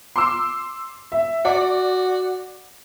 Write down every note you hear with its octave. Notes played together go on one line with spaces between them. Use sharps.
C6 D6 E6
E5
F#4 D5